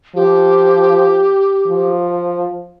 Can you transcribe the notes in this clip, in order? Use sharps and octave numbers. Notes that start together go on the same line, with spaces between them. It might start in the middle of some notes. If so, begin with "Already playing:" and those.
F3 G4
F3